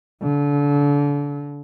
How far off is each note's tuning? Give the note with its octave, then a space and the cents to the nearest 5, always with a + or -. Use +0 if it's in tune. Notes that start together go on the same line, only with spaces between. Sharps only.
D3 -30